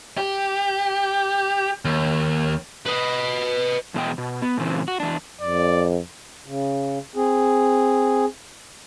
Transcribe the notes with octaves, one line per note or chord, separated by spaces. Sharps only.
G4
D#2
B4 D#5
E2 B2 C4 D#5 G5
B2
B3
A#2 C#3 E3 C4
F#4
E2 D4
F2 D5
C#3
C4 G#4